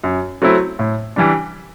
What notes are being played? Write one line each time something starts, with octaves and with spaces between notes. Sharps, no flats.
F#2
F#3 A3 C4 E4
A2
E3 G3 D4